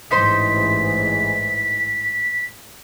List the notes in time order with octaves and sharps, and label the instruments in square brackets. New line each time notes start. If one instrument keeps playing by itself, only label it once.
[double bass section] A1 G#2 E3 [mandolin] D#4 C5 C6 [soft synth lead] B6